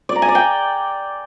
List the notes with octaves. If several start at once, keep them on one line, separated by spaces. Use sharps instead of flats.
D5
A#5
G#5
D5
G5